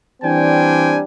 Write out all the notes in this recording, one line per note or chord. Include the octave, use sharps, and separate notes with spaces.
E3 G3 C4 D4 G5 G#5